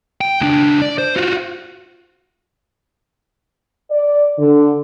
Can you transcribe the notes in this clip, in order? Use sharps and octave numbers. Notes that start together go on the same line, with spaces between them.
G5
C#2 D4
D5
C5
F4 F#4
D5
D3